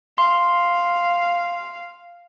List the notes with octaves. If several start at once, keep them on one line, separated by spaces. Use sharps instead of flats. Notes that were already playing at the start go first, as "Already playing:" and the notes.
F5 C6